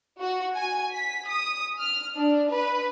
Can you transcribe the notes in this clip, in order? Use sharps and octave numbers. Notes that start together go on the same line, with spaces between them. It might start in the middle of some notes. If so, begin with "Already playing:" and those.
F#4
G#5
B6
D#6
F6
D4
B4